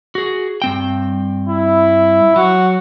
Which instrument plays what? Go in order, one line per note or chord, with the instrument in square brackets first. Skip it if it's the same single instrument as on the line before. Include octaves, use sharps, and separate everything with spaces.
[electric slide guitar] F#4 G#4
G2 C4 G5
[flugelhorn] E4
[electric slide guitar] F#3 [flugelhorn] F#4